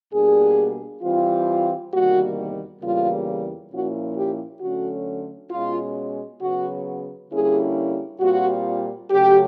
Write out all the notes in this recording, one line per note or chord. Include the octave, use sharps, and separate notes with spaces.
B2 G3 A#3 D4 G#4
E3 G3 C4 F4
E2 C3 D#3 G3 A#3 F#4
E2 C#3 E3 G3 A#3 F4
A#2 F3 A#3 C#4 E4 F#4
G4
D3 F#3 A3 C#4 F#4
B2 G#3 C#4 F4
C#3 F#3 B3 F#4
D3 G3 A#3 C#4 E4 G#4
A#2 G3 C4 F4 F#4
C#3 F#3 A3 C#4 G4